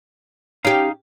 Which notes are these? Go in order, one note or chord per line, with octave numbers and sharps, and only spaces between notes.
C#4 D#4 G4 F5